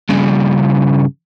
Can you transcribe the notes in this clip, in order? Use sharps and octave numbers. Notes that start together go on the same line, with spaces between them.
G2 C#3